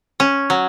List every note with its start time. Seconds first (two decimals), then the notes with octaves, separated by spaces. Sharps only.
0.20 C#4
0.50 F#3